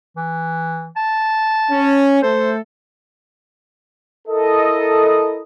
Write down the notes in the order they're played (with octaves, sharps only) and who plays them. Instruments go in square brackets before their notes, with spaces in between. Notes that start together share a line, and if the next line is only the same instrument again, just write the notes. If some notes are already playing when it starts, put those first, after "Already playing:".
[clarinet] E3
A5
[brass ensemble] C#4
[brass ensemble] A3 A4 [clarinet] C5
[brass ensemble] E4 A4 A#4 D#5